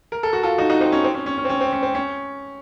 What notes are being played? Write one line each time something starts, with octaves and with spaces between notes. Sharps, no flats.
A#4
A4
F#4
F4 A4
D#4 F#4
D#4 F#4
C4 D#4
C#4
C4
C#4
C#4
C#4
C4
C#4
C4
C#4
C4
C#4